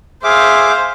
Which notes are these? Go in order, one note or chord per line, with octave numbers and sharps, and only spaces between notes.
G#4 C5 E5 F5 D6